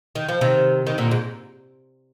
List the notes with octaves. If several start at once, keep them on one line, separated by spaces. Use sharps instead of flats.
D#3
F3
C3 D#3
D#3
A#2 D3
G#2